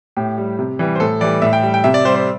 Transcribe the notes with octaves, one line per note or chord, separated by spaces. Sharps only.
A2 G4
G3
C3
E3 G3
C5
A2 A4
E3 G3 D5
A2 E5
G5
G3
G5
C3 E5
D5
G3 C5
C5